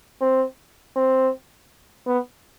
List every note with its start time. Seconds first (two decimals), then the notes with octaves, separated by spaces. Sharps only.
0.21 C4
0.96 C4
2.07 B3